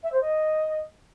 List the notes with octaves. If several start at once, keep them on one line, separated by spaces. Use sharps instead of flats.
E5
C5
D#5